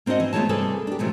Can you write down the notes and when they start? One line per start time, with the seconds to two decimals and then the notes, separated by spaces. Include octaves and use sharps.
0.06 A#3 C4 D4 F#4 D#5 F#5
0.20 E3
0.33 A3 B3 F4 G#4 C#5 A5
0.49 C3 G3 A#3 G#4 A4 B4
0.87 D4 G4
0.99 A#2 C#3 F3 F#3 A3